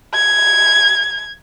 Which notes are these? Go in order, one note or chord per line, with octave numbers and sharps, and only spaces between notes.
G#6